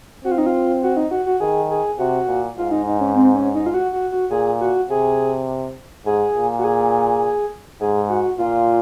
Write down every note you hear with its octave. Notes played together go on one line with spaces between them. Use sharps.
C4 F#4
F4
D#4
F4
F#4
D#4
F#4
F#4
D#3 G#4
G#4
C3 F#4
A#2
G#2 F4
D#4
D#4
C#4
C4
C#4
D#4
F4
F#4
F#4
F#4
A#2 G#4
F#4
C3 G#4
G#2 G#4
A#2
F#4
G#4
G#2 G#4
F#4
A#2 F4